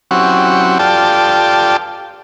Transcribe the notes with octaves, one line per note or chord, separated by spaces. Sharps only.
F#3 C4 C#4 E4 F#4 G4
F4 G4 A4 D5 G5 A5